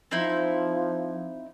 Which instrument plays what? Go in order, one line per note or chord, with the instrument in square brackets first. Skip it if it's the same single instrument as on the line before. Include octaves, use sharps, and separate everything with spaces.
[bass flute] F3 [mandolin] C4 D#4 E4